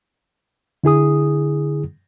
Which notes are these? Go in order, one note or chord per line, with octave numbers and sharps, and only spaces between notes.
D3 E4 G#4 D#6